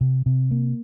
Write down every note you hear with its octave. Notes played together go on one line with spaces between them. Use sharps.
C3
C3
A#3